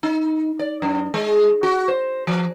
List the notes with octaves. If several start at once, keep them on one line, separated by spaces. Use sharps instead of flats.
D#4
D5
F#2
G#3
F#4
C5
F3